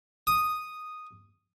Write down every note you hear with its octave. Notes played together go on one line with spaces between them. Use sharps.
D#6